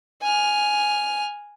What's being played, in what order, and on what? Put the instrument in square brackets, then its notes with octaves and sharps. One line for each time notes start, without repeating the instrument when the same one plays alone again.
[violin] G#5 F6